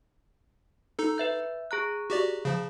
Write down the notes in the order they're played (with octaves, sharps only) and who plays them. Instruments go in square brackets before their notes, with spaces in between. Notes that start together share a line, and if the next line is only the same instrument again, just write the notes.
[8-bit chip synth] D#4 A4
[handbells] B4 E5 G6
G#4 A#5 F#6
[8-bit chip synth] F#4 G4 D5
C#3 F3